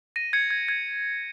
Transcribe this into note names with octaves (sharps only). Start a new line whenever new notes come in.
A#6 D#7
G#6 C#7
G#6
G#6